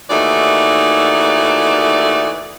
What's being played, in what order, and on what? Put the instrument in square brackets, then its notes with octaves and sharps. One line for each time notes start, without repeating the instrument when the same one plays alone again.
[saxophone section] D#2 E3 A3 D#4 F#4 D5